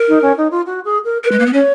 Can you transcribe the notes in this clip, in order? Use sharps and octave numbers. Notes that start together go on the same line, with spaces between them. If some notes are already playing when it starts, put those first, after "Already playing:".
Already playing: A#4
D#4
C#4
D#4
F4
F#4
G#4
A#4
A#4 B4
G#3
A#3
B3
C#4 C#5